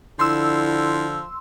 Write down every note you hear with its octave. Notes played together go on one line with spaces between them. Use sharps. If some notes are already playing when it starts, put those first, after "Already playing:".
D3 F3 E4 C6 E6